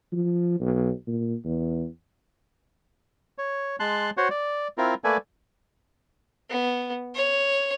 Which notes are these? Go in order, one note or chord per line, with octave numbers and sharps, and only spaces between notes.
F3
B1
A#2
E2
C#5
G#3 A5 C6 F#6
F#4 C5 C#5 F#5
D5
C4 E4 F4 A#4
A3 A#3 A4 B4 D5 G#5
B3
C#5